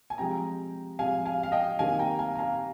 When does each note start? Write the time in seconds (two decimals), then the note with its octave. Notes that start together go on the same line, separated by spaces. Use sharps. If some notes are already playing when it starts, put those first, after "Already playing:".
0.10 G#5
0.18 C3 F3 G#3 G5 A#5
0.99 C3 F3 G#3 F5 G#5
1.25 F5 G#5
1.43 F5
1.52 D#5 G5
1.79 C3 D#3 A#3 F5 G#5
1.99 G5 A#5
2.19 F5 G#5
2.35 A#5
2.39 F5 G#5